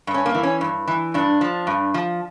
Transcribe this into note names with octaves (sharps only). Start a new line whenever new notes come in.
G2
C#4
A#3
E3
C#4
G2
E3
G2 D4
F3
G2
F3